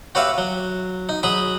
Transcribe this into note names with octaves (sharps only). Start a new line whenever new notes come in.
F#4 G4 B4 C#5 E5 F5
F#3
D#4
F#3 G#4 B5 D#6